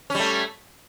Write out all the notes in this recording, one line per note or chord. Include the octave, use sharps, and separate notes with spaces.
G3 A3 C#4